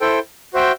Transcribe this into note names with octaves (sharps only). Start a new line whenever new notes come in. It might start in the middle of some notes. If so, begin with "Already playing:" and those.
E4 A4 C5 G5
F#4 C5 E5 G5